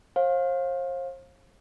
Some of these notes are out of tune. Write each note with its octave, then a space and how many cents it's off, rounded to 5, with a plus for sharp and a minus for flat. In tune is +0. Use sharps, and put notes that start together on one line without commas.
C5 +40 F5 +15